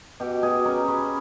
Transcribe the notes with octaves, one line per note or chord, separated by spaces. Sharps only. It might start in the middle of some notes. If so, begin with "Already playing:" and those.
B2 G4
B2 G#4
C#4 A#4
C#4 B4